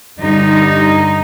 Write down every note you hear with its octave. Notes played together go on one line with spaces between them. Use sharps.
G2 D3 G3 D#4